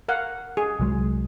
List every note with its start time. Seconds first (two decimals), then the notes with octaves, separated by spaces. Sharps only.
0.08 A#4 F5 F#5
0.57 G#4
0.80 C2 F#3 G#3